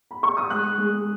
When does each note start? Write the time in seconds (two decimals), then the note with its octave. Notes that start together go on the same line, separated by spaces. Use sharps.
0.11 B5
0.23 C#6
0.37 D#6
0.50 G#3 F#6
0.78 G#3